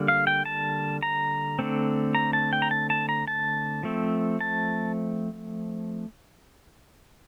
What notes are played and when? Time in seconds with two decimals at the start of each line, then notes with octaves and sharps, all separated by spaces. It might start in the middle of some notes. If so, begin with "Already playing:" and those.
Already playing: D3 G3 A#3
0.08 F5
0.27 G5
0.45 A5
1.03 A#5
1.59 D3 A3 C4
2.15 A#5
2.33 A5
2.53 G5
2.62 A#5
2.71 A5
2.90 A5
3.09 A#5
3.28 A5
3.83 F3 A3 C4
4.41 A5